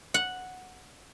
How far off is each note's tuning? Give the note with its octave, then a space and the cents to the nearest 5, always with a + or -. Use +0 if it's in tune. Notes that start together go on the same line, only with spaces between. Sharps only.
F#5 -5